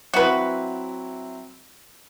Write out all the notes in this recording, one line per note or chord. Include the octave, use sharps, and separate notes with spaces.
F#3 C4 E4 F#4 B4